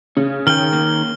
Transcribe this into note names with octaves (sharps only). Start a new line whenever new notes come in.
C#3 C#4
D#3 G5 F6 G7
A#3 C#4